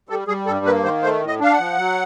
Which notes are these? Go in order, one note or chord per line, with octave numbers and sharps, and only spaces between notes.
G3 A4
G3 G#4
G2 A4
A#3 B4
D#3 C5
A3 C5
A2
D#5
D4 F5
F#5
F3
F#3